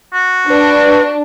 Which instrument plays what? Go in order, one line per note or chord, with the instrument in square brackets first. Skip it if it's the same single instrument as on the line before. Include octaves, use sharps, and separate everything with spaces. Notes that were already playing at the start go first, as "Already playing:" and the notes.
[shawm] F#4
[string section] D4 [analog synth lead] B4